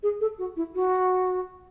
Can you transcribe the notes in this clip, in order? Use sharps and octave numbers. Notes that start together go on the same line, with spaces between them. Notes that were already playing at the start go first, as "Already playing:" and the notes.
G#4
A4
F#4
E4
F#4